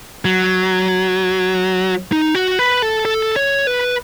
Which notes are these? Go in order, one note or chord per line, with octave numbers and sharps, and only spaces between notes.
F#3
D#4
F#4
B4
A4
A4
C#5
B4